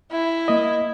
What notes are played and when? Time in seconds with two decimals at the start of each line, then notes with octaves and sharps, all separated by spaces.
0.12 E4
0.48 A#3 D#5